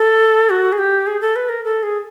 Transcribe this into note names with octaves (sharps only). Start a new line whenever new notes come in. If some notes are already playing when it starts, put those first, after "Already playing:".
Already playing: A4
F#4
G#4
G4
G#4
A4
B4
A#4
A4
G#4